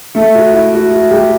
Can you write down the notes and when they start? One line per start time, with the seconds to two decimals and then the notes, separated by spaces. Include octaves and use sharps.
0.15 A3 A4
0.35 F#4
0.53 E4
0.73 F#4
0.91 F#4
1.10 G3 G4